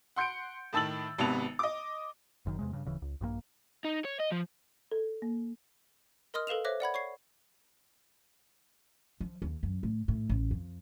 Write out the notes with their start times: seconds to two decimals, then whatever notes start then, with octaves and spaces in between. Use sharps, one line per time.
0.16 F#5 C6 G6 C#7 D7
0.73 A2 D#3 A5 E6 A6 F#7
1.18 G#1 C3 B3 A5 F7
1.59 D#5 D6
2.46 F#1 F#2 D#3
2.59 E2 C3 G#3
2.73 G2 C#3
2.85 D1 C#3 E3
3.02 C#2
3.21 A#1 G2 F#3 A#3
3.84 D#4
4.05 C#5
4.20 D#5
4.31 F3
4.92 A4
5.22 A#3
6.34 A#4 D#5 C6 D#6 F6
6.47 A4 B4 F5 E7 F7
6.64 C5 C#5 E5 D6 F#6 A#6
6.80 D5 F#5 B5 G#6
6.94 C#5 C#6 G#6 C7
9.21 F3
9.42 D#2
9.63 F#2
9.83 A2
10.08 A2
10.29 A1
10.51 F2